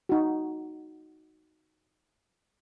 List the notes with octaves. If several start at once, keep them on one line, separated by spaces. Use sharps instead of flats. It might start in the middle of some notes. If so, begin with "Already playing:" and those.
D#4 F#4